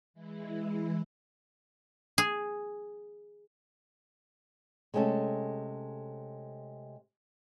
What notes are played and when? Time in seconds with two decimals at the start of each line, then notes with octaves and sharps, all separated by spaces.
0.14 E3 G#3 E4
2.18 G#4
4.94 C3 G#3 A3 C#4 G4 A4